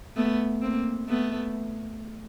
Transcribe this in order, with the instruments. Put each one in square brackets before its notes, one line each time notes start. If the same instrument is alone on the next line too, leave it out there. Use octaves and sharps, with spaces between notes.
[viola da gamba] A3 B3
A#3 C4
A3 B3